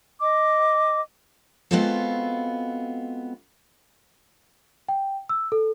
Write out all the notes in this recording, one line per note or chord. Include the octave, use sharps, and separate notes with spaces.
D#5 D6
G#3 B3 C4 F4 F#4 A4
G5
E6
A4